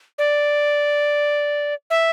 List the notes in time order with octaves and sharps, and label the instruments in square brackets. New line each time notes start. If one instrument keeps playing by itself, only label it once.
[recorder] D5
E5